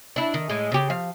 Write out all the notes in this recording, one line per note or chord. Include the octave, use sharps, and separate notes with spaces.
D4 E4
D#3
A2 G#3
C#3 G4
F3 F5